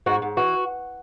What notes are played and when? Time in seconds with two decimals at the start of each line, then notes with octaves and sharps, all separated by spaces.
0.06 G#2 F#4
0.22 G#2
0.37 E3 F#4